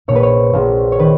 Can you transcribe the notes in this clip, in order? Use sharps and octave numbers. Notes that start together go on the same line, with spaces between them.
A#1 A#2 C#5
B4
C#5
A#1 A#2
C#5
D#3 B4